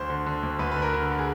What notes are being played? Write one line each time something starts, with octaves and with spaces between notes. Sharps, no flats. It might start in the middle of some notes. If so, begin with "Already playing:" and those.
Already playing: D2 C5
D3
D3
D2
D2 B4
B4
D3
A#4
D3
D3
G#4